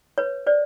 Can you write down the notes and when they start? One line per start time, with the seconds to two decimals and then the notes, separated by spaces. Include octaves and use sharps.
0.18 B4 C#5
0.47 C5 D5